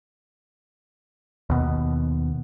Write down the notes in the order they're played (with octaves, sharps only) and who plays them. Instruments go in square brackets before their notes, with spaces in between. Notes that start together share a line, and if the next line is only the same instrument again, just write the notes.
[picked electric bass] D#2 B2